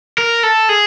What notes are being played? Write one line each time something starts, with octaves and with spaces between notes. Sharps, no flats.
A#4
A4
G#4